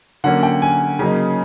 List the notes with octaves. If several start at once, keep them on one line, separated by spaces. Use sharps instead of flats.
D3 F#3 A#3 C#4 F#5
G5
G#5
C#3 F#3 A#3 D#4